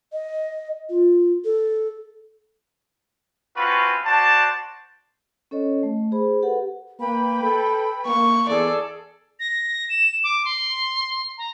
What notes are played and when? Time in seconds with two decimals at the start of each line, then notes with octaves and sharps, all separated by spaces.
0.13 D#5
0.90 F4
1.45 A4
3.57 C4 C#4 F4 F#4 B4
4.06 F#4 C5 D5 A5
5.51 C#4 A4 C#5 D#5
5.83 A3
6.12 G#4 C5 B5
6.43 G4 A4 B4 F#5
7.00 A#3 B4 G5 B5
7.43 A4
8.07 A#3 C#6
8.49 E2 G#4 A4 D5
9.40 A#6
9.90 E7
10.24 D6
10.45 C6
11.38 A#5